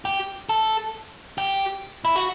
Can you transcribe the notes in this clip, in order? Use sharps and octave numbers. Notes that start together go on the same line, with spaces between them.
G4
A4
G4
E4
F#4